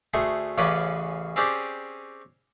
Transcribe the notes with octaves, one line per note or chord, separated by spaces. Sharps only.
D2 A3 G#4 C6 C#6
A1 C#3 C#4 B4 D5 G#5
C4 C#4 G4 G#4 D5